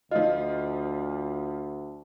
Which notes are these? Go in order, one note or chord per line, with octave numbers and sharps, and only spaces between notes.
D2 F3 F4 D#5